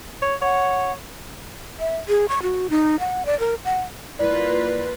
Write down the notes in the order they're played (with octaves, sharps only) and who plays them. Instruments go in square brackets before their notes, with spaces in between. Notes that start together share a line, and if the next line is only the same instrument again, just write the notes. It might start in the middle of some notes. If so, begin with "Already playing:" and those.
[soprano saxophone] C#5
[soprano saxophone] C#5 [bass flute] F#5
[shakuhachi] E5
G#4
C#6
F#4
D#4
F#5
D5
A#4
F#5
[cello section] A#3 F4 B4 [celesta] E4 D5